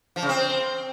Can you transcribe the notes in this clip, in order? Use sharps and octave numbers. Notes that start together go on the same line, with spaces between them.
F3
C#3
C4